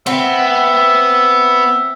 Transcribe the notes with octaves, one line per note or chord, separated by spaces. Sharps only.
B3 C4 E5 F#5